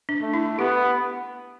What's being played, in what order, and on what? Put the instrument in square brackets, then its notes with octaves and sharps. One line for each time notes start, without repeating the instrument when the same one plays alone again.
[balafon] D4
[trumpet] A3
[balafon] E4
[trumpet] B3 [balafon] G4